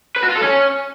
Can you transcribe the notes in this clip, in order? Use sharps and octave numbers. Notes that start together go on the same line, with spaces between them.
B4
F#4
F4
A4
C#4